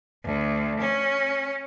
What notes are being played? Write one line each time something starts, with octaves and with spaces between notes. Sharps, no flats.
D2
C#4